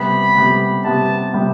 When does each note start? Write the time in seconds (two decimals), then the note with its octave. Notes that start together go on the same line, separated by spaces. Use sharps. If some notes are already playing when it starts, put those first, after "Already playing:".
Already playing: C3 G3 B3 B5
0.36 C3 G3 B3
0.84 C3 G3 B3 A5
1.33 C3 G3 B3